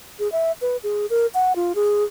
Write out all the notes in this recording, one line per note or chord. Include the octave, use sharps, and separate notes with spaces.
G#4
E5
B4
G#4
A#4
F#5
F4
G#4